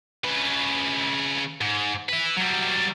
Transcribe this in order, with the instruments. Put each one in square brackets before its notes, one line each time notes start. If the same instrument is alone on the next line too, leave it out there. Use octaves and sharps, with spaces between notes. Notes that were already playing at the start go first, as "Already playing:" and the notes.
[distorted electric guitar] C#3 B4
G#2
B4 E5
F#3 G3